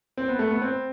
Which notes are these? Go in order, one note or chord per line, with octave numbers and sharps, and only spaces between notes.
C4
B3
A3
B3
C4